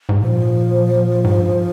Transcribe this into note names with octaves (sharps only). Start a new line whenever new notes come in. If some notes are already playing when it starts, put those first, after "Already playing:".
G#2
A#2 F3
G#2
G2